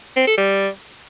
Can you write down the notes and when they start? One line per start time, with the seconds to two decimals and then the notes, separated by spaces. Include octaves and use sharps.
0.16 C4
0.27 A4
0.38 G3